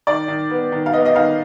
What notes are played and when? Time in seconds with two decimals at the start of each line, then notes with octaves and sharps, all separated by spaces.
0.07 D#3 D5
0.28 D#3
0.51 B3
0.72 D#3
0.86 F5
0.93 B3 D#5
1.05 D#5
1.14 D#3 F5